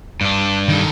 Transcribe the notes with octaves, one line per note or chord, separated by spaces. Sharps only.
G2 D4
D#3 A4